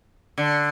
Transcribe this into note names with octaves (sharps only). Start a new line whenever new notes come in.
D3